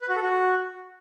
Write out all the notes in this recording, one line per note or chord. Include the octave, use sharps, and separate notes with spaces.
B4
F#4
A4
F#4